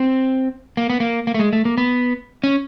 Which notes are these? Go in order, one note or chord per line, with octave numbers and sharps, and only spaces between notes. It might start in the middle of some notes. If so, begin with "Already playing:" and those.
Already playing: C4
A#3
B3
A#3
A#3
A3
G#3
A3
A#3
B3
C#4